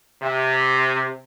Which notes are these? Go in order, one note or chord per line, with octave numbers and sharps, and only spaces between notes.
C3